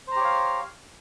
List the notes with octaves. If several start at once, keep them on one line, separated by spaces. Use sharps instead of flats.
G4 C5 C#5 F5 A#5